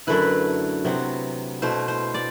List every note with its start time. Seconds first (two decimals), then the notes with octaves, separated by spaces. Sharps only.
0.07 F#2 D3 A3 E4 B4
0.85 C3 F#3 B3
1.62 B2 A3 E4 C5
1.88 C5
2.14 D5